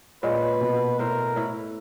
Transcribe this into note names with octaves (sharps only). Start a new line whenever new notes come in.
A#2 G#3 F4 B4 C#5
B2
A2 A#4 C5
A2 E4 B4